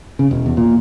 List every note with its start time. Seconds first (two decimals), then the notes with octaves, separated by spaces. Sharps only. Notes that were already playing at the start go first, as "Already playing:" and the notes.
0.19 C#3
0.31 E1
0.46 E2
0.57 A#2